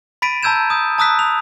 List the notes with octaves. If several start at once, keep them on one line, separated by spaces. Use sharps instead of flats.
B5 A6 B6 D7 D#7
A5 A#5 E6 G6 G#6 E7
D#6 G6
A5 A#5 D#6 E6 F#6 B6
F7